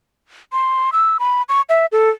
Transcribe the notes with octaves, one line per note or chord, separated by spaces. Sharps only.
C6
E6
B5
C#6
E5
A4